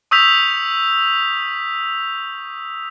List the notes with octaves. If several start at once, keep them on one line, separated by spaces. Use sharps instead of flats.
C#6 D#6 E6 G6 B6 F7